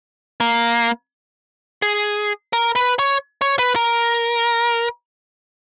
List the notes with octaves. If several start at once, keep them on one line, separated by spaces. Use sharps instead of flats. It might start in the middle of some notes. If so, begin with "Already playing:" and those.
A#3
G#4
A#4
B4
C#5
C#5
B4
A#4